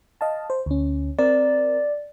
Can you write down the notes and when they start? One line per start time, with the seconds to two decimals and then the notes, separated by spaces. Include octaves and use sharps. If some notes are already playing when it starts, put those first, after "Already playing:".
0.21 D#5 F5 A5
0.50 C5
0.66 D2 C#4
1.19 C4 A#4 D5